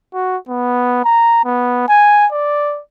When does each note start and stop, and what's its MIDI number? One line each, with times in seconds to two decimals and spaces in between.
0.14 0.37 66
0.49 1.02 59
1.05 1.41 82
1.45 1.84 59
1.89 2.27 80
2.32 2.80 74